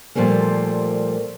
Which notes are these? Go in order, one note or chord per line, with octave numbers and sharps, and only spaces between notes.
A#2 F3 G3 A3 A#3